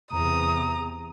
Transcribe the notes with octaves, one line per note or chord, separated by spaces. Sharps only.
E2 C3 A#5 D#6